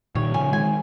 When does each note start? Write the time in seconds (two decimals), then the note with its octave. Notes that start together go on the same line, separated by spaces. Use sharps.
0.15 A#2 D#3 C#5
0.34 C#3 F3 G#5
0.52 D#3 G#3 G#5